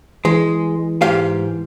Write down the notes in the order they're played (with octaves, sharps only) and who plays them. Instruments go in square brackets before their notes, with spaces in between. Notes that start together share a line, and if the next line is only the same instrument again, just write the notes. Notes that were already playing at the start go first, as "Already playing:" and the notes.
[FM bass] E3 [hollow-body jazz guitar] G#3
[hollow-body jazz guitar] G#2 G4 F5